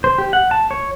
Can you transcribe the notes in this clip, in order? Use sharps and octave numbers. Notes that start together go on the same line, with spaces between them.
C5
G4
F#5
A5
C#5